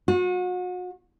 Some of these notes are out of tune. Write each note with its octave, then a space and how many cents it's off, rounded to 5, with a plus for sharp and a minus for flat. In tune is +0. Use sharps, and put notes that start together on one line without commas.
F#4 -35